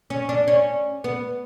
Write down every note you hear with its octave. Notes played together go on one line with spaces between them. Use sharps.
C#4
D4
C#4
B3